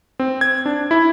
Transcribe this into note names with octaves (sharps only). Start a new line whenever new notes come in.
C4
G#6
D4
E4